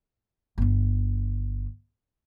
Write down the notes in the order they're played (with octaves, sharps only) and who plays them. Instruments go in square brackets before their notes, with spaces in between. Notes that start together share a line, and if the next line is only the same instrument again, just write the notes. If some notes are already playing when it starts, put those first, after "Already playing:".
[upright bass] G1 D4